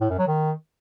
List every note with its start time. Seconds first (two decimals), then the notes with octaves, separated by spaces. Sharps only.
0.01 A2
0.10 F#2
0.19 F#3
0.28 D#3